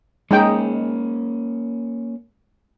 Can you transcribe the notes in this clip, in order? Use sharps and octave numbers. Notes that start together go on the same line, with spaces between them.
G#3 A#3 C#4 D#4 G5